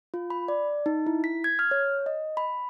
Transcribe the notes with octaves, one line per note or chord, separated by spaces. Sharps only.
F4
B5
D5
D#4
E4
B6
G#6
F6
C#5
D#5
B5